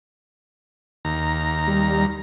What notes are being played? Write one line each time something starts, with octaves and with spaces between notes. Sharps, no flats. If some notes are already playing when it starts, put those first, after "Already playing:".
D#2 A#5
G3